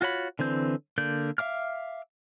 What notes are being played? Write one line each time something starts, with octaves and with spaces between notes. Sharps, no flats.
F4 F#4 C#5 B5
D3 E3 C4 G6
D3 A#3 D5 G6
E5 F5 D6 F6